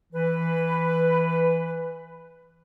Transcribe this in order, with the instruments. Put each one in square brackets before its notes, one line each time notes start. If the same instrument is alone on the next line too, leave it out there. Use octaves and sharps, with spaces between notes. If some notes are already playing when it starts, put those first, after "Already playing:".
[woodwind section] E3 B4